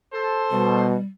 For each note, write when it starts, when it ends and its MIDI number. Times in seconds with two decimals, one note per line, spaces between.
0.13 0.86 69
0.13 0.86 72
0.51 0.95 47
0.51 1.04 55